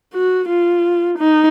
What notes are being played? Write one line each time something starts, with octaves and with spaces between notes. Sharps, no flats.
F#4
F4
D#4